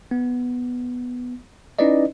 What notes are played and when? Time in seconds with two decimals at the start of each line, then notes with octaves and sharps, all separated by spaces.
0.11 B3
1.79 C#4 D#4 E4 B4 D5 D#5